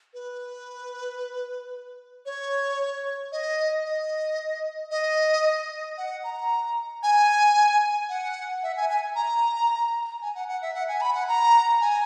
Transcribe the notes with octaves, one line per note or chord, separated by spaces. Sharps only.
B4
C#5
D#5
D#5
D#5
F#5
A#5
G#5
F#5
E5
G#5
G#5
A#5
G#5
F#5
F#5
E5
F#5
G#5
B5
F#5
A#5
G#5